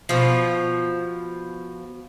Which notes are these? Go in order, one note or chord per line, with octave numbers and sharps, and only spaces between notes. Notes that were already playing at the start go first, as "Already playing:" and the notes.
B2 F3